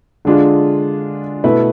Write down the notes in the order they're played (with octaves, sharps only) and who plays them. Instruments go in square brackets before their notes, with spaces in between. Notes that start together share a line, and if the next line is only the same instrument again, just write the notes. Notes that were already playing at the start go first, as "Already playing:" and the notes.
[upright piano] D3 G#3 D4 F4 G#4
B2 A3 E4 B4